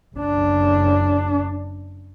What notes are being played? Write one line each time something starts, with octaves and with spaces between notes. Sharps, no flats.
F#1 D4